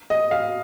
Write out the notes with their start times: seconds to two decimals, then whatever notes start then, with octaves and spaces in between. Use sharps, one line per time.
0.10 D#5
0.31 F5